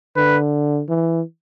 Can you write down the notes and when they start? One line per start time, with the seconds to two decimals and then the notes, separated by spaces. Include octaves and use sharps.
0.16 D3 B4
0.89 E3